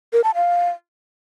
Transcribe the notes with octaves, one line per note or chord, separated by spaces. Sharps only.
A#4
A5
F5